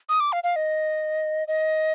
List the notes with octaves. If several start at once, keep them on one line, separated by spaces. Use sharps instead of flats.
D#6
D6
F5
F5
D#5
D#5